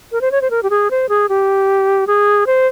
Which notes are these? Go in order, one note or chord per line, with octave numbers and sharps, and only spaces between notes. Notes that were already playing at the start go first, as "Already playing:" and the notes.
A#4
C5
C#5
C5
A#4
G4
G#4
C5
G#4
G4
G#4
C5